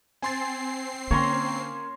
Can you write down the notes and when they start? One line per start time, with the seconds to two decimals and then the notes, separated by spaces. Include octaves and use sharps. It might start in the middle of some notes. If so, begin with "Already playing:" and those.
0.22 C4 G#5 C6 A6 C7
1.11 D3 A#3 C#4 C#5 A#5 C6